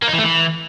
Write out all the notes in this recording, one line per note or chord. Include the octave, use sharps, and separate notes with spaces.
A#3
D#4
E3
A3
E3